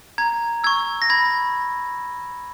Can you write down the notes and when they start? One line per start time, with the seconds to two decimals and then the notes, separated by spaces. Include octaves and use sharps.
0.18 A#5 G#6
0.64 C#6 E6 G#6
1.02 A#6
1.10 B5 G#6